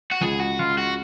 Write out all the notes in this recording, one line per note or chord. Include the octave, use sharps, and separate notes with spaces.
F#4
C#2 G#4
F#4
C#2 F4
F#4